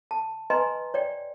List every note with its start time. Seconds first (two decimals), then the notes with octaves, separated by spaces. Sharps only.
0.11 A5
0.50 B4 D#5 G#5 A#5 C6
0.94 C#5 D5 G5